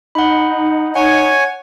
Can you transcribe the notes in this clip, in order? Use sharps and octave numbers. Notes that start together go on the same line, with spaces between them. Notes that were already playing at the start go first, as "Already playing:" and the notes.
D#4 F#5 B5
C#5 F#5 G#5